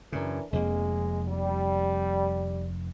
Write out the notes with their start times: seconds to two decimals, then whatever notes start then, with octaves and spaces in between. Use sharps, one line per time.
0.12 F#2 C#3 E3 D4 A#4
0.53 F1 F2 G#3 A#3
1.28 G3